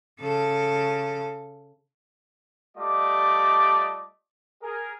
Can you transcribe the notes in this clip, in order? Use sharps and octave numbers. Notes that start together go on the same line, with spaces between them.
C#3 A4
G3 A3 F4 D5 D#5 D6
G#4 A#4